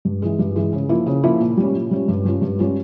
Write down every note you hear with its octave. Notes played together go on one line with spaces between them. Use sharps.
G2
E3 G#3
G2
E3 G#3
C#3
F3 A#3 E4
C#3
F3 A#3 E4
A#2
G3 C#4
A#2
G3 C#4
G2
G3 C#4 F4
G2
G3 C#4 F4